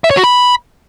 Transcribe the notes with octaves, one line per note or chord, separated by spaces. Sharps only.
E5
C#5
F#4
B5